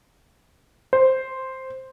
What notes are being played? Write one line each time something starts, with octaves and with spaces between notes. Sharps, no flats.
C5